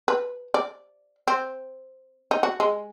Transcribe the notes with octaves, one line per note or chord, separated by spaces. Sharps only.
B4
D5
C4
D#4
F#4
G#3